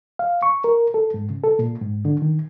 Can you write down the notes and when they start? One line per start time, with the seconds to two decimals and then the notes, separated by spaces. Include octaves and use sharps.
0.19 F5
0.43 C#6
0.64 A#4
0.94 A4
1.14 G#2
1.30 C#3
1.44 A4
1.59 A#2
1.81 G#2
2.05 D3
2.22 D#3